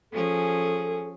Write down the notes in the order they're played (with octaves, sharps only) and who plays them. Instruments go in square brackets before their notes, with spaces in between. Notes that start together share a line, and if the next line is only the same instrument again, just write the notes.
[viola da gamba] F3 C#4 G#4 [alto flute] A4